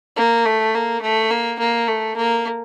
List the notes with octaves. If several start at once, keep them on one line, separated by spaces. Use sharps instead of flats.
A#3
A3
A#3
A3
A#3
A#3
A3
A#3